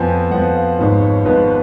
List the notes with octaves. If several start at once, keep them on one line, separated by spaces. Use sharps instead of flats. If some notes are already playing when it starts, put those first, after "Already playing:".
Already playing: F2 F3 B3 G#5
F2 F3 B3 F#5
F5
G#1 G#2 F3 B3 C#5
C#5
G#1 G#2 F3 B3 B4